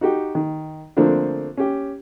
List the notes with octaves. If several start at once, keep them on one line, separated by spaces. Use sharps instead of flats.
D#4 F#4 G4
D#3
D3 F3 A3 A#3 C4 D4
C#4 G4